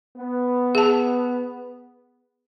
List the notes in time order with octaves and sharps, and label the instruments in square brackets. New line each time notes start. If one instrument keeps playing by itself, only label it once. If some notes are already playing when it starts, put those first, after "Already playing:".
[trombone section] B3
[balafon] G#4 A5